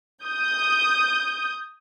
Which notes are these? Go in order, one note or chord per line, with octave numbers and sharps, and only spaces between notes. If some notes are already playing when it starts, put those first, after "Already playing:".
D#6 G6